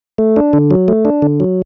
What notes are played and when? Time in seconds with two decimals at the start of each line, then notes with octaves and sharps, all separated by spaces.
0.18 A3
0.36 D4
0.53 D3
0.71 F#3
0.88 A3
1.05 D4
1.22 D3
1.40 F#3